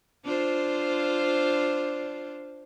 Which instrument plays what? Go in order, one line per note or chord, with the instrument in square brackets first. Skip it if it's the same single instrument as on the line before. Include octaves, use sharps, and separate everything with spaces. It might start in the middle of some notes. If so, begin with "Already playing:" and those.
[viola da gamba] D4 F4 C5